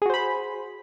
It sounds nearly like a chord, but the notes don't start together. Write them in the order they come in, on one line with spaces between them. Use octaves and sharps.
G#4 F#4 C5 B5